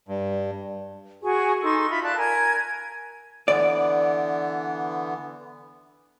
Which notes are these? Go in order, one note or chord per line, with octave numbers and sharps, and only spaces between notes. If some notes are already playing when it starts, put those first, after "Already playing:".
G2
F#4 G#4 G#5 C#6
D#4 A4 C6 C#6
F4 E5 B5
D5 F5 A5 F#6
A#4 G#5 G#6
D3 E3 B3 D5